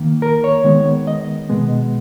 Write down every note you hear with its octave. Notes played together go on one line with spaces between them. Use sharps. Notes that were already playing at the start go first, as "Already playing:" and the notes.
Already playing: D#3 A#3
A#4
C#5
D#3 G#3 B3
D#5
B2 G#3 B3